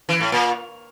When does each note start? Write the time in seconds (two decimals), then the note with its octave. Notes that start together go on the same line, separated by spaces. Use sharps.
0.09 E3
0.20 A2
0.32 A#2